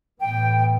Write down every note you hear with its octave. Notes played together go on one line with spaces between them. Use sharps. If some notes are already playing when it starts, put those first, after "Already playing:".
A2 E3 B3 G5